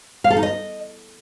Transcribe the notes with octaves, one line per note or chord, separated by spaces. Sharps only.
F5
A4
D#4
D#5